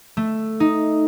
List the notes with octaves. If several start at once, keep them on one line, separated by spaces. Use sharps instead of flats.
A3
D#4